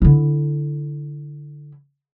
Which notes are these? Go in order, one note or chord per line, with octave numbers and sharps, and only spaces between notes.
D3 E4